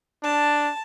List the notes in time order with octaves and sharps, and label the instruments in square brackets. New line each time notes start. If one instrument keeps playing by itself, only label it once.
[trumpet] D4 [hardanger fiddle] A5